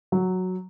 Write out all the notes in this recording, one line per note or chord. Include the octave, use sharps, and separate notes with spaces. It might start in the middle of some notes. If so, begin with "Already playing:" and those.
F#3